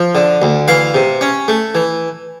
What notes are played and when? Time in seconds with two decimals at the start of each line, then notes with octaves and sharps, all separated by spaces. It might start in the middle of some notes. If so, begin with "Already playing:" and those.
Already playing: F3
0.15 D3
0.42 D2
0.68 E3 F5
0.95 C3
1.21 C#4
1.48 A3
1.75 E3